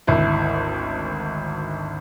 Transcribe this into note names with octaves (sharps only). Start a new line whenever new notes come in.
G#1 D2 E4